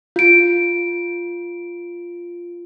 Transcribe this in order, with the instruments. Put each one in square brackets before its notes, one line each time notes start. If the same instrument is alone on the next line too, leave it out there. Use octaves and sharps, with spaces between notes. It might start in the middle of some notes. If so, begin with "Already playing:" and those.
[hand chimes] F4 D7